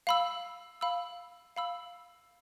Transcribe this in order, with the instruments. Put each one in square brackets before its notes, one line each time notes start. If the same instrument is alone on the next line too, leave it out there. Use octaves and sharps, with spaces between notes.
[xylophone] F5 B5 E6
F5 B5 E6
F5 B5 E6